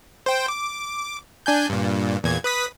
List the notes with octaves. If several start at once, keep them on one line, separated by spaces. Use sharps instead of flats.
C5 G5
D6
D4 G#5 G6
G2 A#2
E2 A#2 G#6
B4 D#6 B6